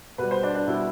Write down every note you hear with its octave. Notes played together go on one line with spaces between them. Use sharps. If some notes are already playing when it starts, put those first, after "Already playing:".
B2 G3 B4
C5
D4
D4
B2 G3 E4